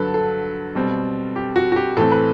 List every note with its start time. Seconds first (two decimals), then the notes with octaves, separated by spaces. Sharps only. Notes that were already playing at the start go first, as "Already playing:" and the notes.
Already playing: G2 D3 F#3 A4 B4 A5
0.14 A4
0.75 B2 G3 C4
1.36 G4
1.56 F#4
1.72 F#4
1.76 G4
1.97 A2 E3 A3 C4 A4
2.11 B4